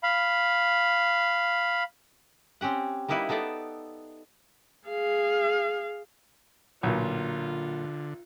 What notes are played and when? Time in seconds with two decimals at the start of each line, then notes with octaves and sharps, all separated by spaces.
0.03 F5 B5
2.61 C4 C#4 G4 F#5
3.08 G3 A#3 D#4 E4 B4
3.29 B3 D#4 A4 D5 E5
4.88 G#4 F5
6.83 B1 A#2 D3 F#3 F4